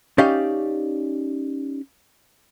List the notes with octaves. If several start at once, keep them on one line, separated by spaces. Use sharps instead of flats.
C#4 D#4 G4 D5 F5